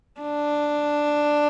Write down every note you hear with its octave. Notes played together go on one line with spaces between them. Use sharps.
D4